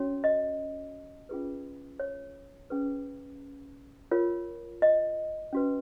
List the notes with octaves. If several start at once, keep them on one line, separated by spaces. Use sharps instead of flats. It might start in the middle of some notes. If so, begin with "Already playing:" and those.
Already playing: C#4 F#4 C#5
D#5
C#4 F4 G#4 B4
C#5
C#4 G#4 B4
F4 A#4 C#5
D#5
C#4 F#4 B4